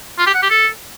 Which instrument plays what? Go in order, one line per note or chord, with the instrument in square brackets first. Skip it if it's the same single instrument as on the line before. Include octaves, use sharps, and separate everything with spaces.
[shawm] F4
G4
F#5
G4
A4